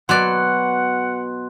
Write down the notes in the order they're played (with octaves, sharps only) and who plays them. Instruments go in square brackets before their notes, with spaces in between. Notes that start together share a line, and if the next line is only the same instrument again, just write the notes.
[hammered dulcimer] B2 [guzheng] F#3 B4 D5 [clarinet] F#5 [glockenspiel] C6 F#6